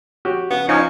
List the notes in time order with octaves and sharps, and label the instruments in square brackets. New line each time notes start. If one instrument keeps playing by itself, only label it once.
[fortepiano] F#4 G4 C#5
[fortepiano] C#3 [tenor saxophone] B3
[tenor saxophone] F3 [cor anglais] C#4 [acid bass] D#4